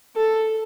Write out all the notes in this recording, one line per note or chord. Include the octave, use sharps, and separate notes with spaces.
A4